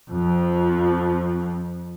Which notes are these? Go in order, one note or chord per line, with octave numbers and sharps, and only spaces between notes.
F2 F3